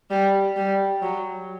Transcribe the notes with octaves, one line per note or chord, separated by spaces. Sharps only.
G3
G3
F#3